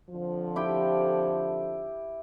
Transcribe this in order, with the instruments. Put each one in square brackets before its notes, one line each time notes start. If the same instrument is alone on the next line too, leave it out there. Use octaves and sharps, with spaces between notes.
[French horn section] F2 D3 F3
[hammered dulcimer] E4 G4 G5